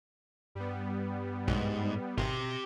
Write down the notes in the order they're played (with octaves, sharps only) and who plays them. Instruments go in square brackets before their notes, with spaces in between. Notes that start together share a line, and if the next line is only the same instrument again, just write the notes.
[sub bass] G2 [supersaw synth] G3 B3
[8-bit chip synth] B1 [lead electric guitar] G#2
[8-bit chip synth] G#1 [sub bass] B2 [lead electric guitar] G4 C6 [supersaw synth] A#6